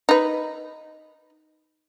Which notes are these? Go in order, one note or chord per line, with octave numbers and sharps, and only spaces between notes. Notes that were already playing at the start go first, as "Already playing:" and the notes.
D#4 B4